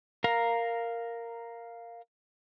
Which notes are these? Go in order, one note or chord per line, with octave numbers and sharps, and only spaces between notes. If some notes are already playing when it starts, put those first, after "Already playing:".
A#4 F5 A#5